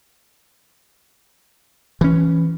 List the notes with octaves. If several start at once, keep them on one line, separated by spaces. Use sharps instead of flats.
E3 C#4